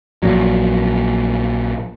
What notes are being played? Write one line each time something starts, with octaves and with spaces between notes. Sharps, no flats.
A#1 A#2 F#3